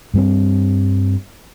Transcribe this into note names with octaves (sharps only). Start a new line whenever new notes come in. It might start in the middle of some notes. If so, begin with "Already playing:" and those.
G2 G3 C4